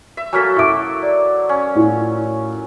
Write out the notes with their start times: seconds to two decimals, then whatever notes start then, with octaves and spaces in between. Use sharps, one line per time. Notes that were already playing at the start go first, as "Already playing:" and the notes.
0.17 E5
0.33 F#3 A#3 A4 G#5 F6 B6
0.57 E4 E5 C#6 D6 D7
1.03 D5
1.49 C#4
1.75 A2 F4